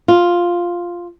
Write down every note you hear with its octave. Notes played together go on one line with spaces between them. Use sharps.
F4